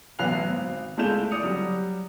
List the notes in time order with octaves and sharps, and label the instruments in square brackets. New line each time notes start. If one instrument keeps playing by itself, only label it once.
[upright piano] A1 B2 F#3 F#6 C7 F7
G#1
C#2 G#3 A3 E4 G6 E7
D5 D#6 C#7 F7
F#3 G3